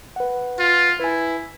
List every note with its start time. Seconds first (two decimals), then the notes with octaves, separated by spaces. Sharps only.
0.16 B4 F#5
0.59 F4
1.00 E4 B4 G#5